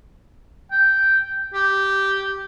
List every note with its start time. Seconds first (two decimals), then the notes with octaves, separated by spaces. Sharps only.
0.71 G5
1.54 G4